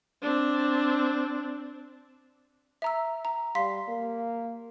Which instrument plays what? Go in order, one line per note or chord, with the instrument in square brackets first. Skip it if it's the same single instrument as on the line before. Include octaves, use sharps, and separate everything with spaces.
[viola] C4 D4
[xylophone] E5 A#5 E6
A#5
[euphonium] G3 [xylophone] F5 C6 B6
[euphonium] A#3